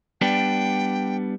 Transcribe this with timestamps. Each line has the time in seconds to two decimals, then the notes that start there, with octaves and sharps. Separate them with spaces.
0.21 G3 B3 D4 G5